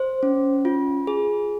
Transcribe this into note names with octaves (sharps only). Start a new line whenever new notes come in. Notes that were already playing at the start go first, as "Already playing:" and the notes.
Already playing: C5
C#4
F4
G#4